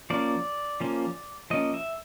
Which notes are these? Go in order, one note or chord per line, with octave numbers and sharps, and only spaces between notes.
F3 A#3 C#4 D5
F3 A#3 C#4
F3 A#3 C#4 D#5
E5